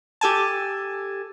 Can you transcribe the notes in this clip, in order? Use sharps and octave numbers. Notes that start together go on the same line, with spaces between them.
G4 A4 G#5 A5